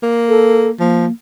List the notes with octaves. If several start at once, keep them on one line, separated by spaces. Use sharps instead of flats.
A#3
A4
F3 A#3